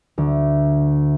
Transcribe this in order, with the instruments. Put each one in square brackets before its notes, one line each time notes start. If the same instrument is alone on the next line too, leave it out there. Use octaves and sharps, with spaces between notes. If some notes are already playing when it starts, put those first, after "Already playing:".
[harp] D2